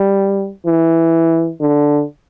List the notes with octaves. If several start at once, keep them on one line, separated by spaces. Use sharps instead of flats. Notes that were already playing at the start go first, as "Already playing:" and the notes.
Already playing: G3
E3
D3